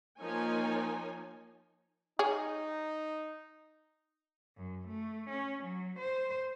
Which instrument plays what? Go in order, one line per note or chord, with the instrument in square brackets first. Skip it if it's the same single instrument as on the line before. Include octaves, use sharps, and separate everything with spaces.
[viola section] F3 A#3 D#4 C#5 G#5
[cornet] D#4 [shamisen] G#4 C#5
[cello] F#2
A3
C#4
F#3
C5